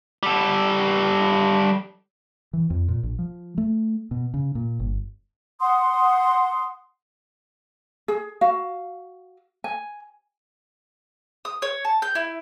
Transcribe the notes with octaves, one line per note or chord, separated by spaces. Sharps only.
G3 A4
E3
F2
A#2
A#1
F3
A3
B2
C#3
A#2
G1
F#5 C6 D#6
G#4
F#4 F5
G#5
D#6
C#5
A5
G6
E4